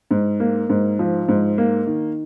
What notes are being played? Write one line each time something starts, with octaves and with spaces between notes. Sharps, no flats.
G#2
A#3
G#2
F3
G#2
A#3
D#3